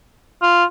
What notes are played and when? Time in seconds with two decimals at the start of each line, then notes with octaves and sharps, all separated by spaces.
0.42 F4